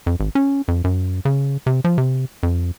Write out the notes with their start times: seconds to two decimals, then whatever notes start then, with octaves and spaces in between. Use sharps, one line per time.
0.06 F2
0.20 G#1
0.35 C#4
0.68 F2
0.84 F#2
1.25 C#3
1.66 C3
1.84 F3
1.98 C3
2.43 F2